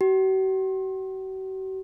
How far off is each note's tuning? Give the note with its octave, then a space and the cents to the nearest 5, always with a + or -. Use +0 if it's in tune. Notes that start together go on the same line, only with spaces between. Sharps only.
F#4 +45